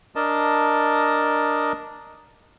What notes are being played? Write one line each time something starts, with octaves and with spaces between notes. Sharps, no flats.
D4 A#4 D#5 A5